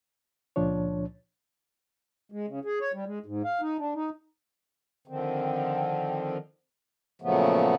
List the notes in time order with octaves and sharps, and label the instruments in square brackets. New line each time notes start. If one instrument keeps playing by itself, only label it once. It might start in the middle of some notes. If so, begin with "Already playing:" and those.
[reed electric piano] C#2 A#2 F3 D4 C#5
[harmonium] G#3
C#3
G#4
C#5
G3
G#3
G#2
F5
D#4
D4
D#4
D3 D#3 F3 C4
A#2 C#3 F3 F#3 A3 B3